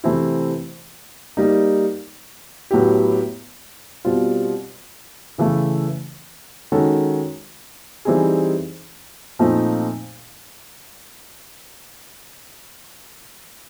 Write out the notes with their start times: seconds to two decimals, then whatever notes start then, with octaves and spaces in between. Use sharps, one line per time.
0.04 C3 E3 A3 C4 E4
1.37 G3 A#3 D#4
2.71 A2 F#3 B3 E4 G4
4.05 B2 G3 C4 F4
5.38 C#3 E3 A3
6.72 D#3 G#3 C#4 F#4 A4
8.05 E3 G3 C4 D#4 G#4
9.39 A#2 F3 A3 C4 D#4